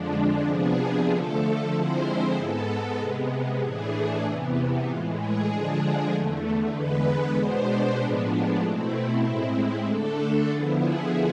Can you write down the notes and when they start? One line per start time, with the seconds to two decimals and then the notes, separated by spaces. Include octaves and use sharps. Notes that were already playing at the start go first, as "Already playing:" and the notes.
Already playing: F2 D3 F3 G#3 D4
0.48 C3 F3 B3 D4 G#4
1.10 D3 F3 A3 A4
1.73 D3 F3 G#3 C4 E4 C5
2.36 G#2 G#3 B3 A4
2.99 C3 G#3 B3
3.61 A2 E3 A3 D4 G#4
4.24 E2 C3 E3 B3
4.86 A2 E3 G#3 F4
5.17 G#4
5.50 D3 F3 G#3 D4
6.12 E2 D3 A3
6.75 E2 D3 G#3 B3 B4
7.37 B2 G#3 B3 D4 C5
7.99 A2 F3 G#3 B3 D4
8.62 B2 A3 C4 E4
9.25 A2 G#3 C4 E4
9.88 D3 A3 D4 A4
10.50 D3 F3 B3 E4 G#4
10.81 G#4